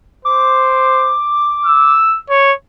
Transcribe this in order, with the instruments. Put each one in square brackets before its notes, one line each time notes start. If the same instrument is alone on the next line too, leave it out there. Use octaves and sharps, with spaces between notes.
[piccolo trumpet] C5 [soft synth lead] D6
[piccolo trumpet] E6
C#5